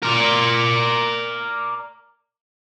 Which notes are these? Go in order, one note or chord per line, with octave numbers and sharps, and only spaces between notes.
A#4 D5